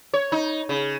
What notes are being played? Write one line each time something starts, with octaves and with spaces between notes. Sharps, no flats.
C#5
D#4
C#3